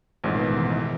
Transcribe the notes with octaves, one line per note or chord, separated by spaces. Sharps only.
A1 F2 G#2 B2 D#3 E3